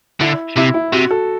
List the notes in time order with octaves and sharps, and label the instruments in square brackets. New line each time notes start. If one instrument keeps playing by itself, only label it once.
[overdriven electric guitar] D3 [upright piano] E4
[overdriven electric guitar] C3 [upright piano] E4
[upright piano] E4
[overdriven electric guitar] C3 [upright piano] F#4
[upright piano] A4